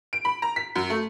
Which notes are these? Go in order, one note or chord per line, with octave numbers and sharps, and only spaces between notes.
D7
B5
A#5
B6
F#2
A3